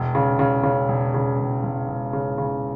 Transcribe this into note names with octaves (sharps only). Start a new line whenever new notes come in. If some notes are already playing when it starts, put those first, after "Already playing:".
Already playing: E1
C#3
C#3
C#3
E1
C#3
E1
E1
E1
C#3
C#3